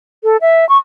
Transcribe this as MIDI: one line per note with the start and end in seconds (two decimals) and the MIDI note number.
0.24 0.37 69
0.41 0.67 76
0.69 0.77 85